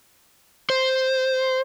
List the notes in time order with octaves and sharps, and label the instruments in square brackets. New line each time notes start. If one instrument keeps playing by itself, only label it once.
[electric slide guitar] C5